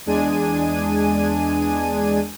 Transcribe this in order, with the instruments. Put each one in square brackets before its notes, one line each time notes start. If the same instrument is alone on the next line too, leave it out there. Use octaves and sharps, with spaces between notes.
[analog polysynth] E2 G#3 D4 G#4 G#5 D#7